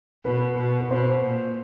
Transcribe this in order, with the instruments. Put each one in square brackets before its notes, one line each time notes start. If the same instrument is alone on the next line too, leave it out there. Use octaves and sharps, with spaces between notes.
[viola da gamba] B2 [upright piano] B4
[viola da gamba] B2
[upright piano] B4
[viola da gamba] B2 [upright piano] C5
[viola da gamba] A#2